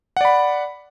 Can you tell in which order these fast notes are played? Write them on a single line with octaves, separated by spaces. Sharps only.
F#5 D5 B5